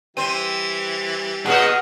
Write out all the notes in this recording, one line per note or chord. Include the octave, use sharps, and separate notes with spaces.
E3 G3 C4 C5 D#7
A#2 F#4 G#4 D#5 F#5 D#6 F6